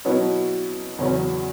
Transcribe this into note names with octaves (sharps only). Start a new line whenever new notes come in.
B2 F#3 C#4 E4 B4
E2 C#3 F#3 C#4